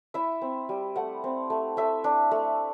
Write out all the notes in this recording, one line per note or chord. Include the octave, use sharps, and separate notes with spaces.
E4 E5
C4
G3
A3 F#5
C4
A3
A3 E5
D4
A3